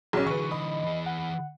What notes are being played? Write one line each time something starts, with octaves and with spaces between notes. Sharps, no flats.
B1 C#4 G#4
D3 E3 B4 C#6
D#5 B5
E3 G#4
F#5